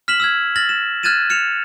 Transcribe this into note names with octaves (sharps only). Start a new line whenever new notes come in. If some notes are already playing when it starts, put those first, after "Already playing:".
F6 B6 E7 F#7
E6 F6 G#6
F6 A6 A#6 F#7
E7
F6 F#6 G#6 A6 D#7 E7
F6 C#7 E7 F7